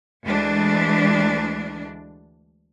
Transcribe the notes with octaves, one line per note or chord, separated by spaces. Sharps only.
D2 E3 G#3 D4